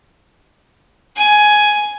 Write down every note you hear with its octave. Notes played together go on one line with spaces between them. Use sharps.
G#5